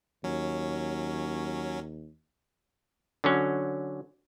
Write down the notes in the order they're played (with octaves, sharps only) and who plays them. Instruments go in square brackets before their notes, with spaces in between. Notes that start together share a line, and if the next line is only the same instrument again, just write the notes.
[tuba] D#2 [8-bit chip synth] F#3 C#4
[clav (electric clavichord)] D3 F#3 C#4